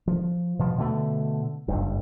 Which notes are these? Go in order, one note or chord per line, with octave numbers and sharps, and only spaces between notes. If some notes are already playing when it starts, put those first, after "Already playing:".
F3
B2 F3
B2 D3 A3
F#1 G2